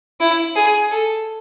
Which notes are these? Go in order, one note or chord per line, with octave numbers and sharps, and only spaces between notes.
E4
G#4
A4